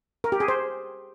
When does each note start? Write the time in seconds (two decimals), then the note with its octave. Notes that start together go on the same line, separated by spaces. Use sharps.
0.24 A#4
0.32 G4
0.40 G#4
0.48 C5